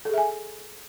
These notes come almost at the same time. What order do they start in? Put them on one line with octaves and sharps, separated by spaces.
A4 G#4 E5 G#5